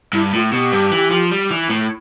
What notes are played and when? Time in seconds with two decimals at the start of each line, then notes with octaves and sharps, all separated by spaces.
0.13 G2 E4
0.33 A2 F4
0.52 B2 G4
0.72 G2
0.92 E3
1.11 F3
1.31 G3
1.51 E3
1.70 A2